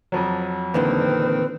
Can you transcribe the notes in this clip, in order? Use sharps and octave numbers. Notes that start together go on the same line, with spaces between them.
F2 F3 F#3
E2 A#2 D3 D#3 C4 B4